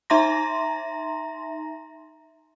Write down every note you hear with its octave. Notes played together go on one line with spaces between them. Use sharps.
D#4 E5 A#5 C6 A#6